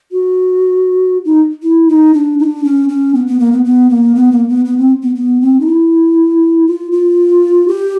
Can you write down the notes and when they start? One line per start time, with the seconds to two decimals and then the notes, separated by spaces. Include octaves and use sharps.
0.12 F#4
1.25 D#4
1.63 E4
1.89 D#4
2.14 D4
2.39 D#4
2.44 D4
2.64 C#4
2.89 C#4
3.14 B3
3.27 B3
3.40 A#3
3.52 B3
3.65 B3
3.90 A#3
4.15 B3
4.32 A#3
4.49 B3
4.65 B3
4.78 C4
5.03 B3
5.16 B3
5.41 C4
5.60 D#4
5.66 E4
6.67 F4
6.92 F4
7.68 G4